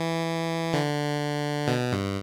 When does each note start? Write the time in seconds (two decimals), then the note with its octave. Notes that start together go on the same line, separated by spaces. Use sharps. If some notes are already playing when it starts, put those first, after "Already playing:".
Already playing: E3
0.73 D3
1.68 B2
1.92 G2